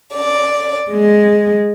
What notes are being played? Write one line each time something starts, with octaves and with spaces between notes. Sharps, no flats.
D5
G#3